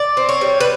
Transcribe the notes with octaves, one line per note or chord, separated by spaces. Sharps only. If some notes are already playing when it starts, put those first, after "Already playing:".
Already playing: D5
C4
C#5
G3
B4